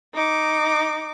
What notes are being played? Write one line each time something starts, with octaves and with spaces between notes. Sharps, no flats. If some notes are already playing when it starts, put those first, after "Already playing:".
D#4 D6